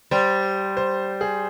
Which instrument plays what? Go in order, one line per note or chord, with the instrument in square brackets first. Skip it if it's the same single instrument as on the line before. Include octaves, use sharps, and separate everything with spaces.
[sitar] G3 [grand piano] C5
[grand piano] C5
G#4